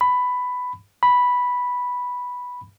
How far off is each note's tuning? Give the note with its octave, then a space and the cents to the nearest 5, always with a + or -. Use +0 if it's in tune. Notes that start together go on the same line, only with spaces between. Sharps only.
B5 +10
B5 -5